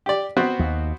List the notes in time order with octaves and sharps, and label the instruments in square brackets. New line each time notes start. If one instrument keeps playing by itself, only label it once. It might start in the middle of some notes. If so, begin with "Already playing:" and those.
[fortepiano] G4 D5
B3 C4 F#4
[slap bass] D#2